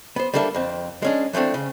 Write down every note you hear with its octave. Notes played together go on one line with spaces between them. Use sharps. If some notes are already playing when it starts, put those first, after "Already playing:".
B3 C5
G3 A#3 D4 A4 E5
F2 C4
G#3 C#4 D4
E3 F3 A3 C4 D4
C#3